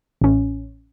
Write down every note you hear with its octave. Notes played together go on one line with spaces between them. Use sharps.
A1 C#4